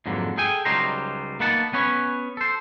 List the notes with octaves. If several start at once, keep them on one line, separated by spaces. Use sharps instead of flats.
F2 G#2 D3 F#3 A#3
G#4 A4 G5 G#5
C#2 F#3 G3 D#4 C5 A#5
A#3 B3 D#4 F#5 A5
B3 C#4 B4 C#5
A4 C5